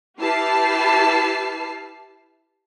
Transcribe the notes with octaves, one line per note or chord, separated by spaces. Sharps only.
E4 G4 B4 A5 F6 C7